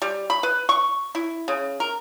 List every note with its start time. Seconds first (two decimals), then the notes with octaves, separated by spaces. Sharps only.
0.02 G3
0.30 B5
0.43 B4
0.69 C#6
1.15 E4
1.48 C#3
1.80 A#4